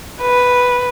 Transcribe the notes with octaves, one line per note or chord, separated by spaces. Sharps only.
B4